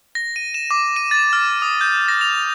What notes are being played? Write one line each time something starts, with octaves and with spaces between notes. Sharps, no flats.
A#6
D#7
E7
D6
D#7
A6
F6
D#6
G6
A#6
F7